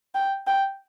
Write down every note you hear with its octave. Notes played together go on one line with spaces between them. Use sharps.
G5
G5